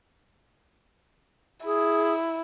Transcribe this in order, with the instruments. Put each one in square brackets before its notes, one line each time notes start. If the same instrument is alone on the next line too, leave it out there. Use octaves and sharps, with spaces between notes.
[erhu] E4 [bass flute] G#4